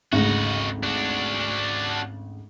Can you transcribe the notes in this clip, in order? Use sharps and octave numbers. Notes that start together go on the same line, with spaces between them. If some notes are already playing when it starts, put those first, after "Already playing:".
G#1 D2 C#3 D#4 F#4
D4 F#4